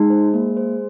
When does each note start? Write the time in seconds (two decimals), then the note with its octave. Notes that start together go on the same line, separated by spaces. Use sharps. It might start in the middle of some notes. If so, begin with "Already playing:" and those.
Already playing: G#3 D#4
0.10 C5
0.34 A#3
0.57 C5